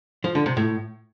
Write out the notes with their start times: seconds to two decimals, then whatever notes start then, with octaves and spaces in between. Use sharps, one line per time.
0.24 F3
0.35 D3
0.46 C3
0.57 A2